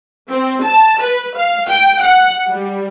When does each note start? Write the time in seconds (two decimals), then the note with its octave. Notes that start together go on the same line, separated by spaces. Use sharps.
0.31 C4
0.63 A5
1.02 B4
1.37 F5
1.68 G5
2.02 F#5
2.47 G3